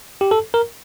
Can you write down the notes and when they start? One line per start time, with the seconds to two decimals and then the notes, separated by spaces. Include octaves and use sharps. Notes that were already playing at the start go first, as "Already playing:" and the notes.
0.21 G4
0.31 A4
0.54 A#4